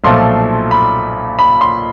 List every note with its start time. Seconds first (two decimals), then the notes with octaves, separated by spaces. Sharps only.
0.04 B1 A#2 F3 A3 C6
0.71 B5
1.39 B5
1.61 C6